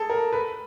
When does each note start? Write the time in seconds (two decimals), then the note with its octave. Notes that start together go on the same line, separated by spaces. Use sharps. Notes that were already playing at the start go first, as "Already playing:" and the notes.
Already playing: G#4 A4
0.10 A#4
0.33 B4